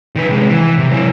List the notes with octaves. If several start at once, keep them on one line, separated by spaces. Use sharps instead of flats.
D#3 B4
C3 G#3
E3
C3
F#3 E4